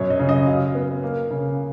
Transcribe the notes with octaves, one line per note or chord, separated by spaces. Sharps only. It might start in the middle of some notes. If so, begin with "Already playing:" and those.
Already playing: F#2 B2 C#5
D#5
C#3
D#5
F#3 F5
B3
A#3
C#3